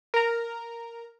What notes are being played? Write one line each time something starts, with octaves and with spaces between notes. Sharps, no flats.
A#4 A#5